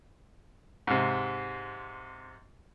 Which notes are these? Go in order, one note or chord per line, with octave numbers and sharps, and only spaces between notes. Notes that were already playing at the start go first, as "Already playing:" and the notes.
G#2 C3